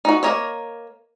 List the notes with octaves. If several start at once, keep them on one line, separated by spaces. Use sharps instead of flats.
D#4 F#4
A#3 A4 A#4 C#5 D#5